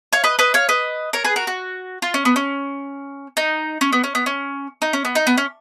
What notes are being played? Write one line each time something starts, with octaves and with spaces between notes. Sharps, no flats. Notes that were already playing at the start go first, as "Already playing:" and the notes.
C#5 F5
B4 D#5
B4 D#5
C#5 F5
B4 D#5
A#4 C#5
G#4 B4
F#4 A#4
F#4
F4
C#4
B3
C#4
D#4
C#4
B3
C#4
B3
C#4
D#4
C#4
B3
D#4
B3
C#4